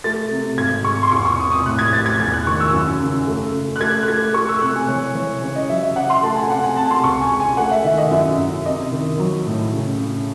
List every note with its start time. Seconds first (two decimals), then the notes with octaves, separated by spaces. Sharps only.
0.04 A3 A6
0.31 C3
0.58 G#1 G#6
0.85 G#3 C#6
1.03 C6
1.12 E2 C#6
1.25 C#6
1.38 C3 D#6
1.52 D#6
1.66 A2 F#6
1.79 G#6
1.92 A1 A6
2.06 G#6
2.20 E2 G#6
2.33 F#6
2.47 D#3 C#6
2.60 E6
2.73 F#2
3.00 C#3
3.27 A3
3.54 C#3
3.76 F#6
3.80 A3 G#6
4.03 F#6
4.08 A3 G#6
4.34 A3 C#6
4.49 E6
4.61 C3 F#6
4.76 G#5
4.88 E3 C#5
5.15 E3 C#5
5.42 C#3 C#5
5.56 D#5
5.69 F#3 E5
5.83 E5
5.96 C#3 F#5
6.10 C6
6.23 A3 A5
6.37 G#5
6.50 C3 F#5
6.63 G#5
6.76 C3 A5
6.91 C6
7.04 C#2 C#6
7.22 G#5
7.31 C#2
7.40 G#5
7.57 A3 F#5
7.71 E5
7.84 D#3 E5
7.98 D#5
8.11 F#2 E5
8.38 F#2
8.65 C3 D#5
8.92 D#3
9.18 F#3
9.46 A2
9.73 C#3
9.99 C#3